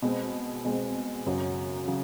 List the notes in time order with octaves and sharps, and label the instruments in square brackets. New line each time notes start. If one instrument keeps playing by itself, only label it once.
[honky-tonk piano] B2 G#3 C4
B2 G#3 C4
F#2 C#3 F#3
C#3 F#3